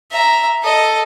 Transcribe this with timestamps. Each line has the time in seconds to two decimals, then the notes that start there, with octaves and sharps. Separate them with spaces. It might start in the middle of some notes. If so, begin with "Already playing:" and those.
0.11 E5 A#5
0.63 A4 D#5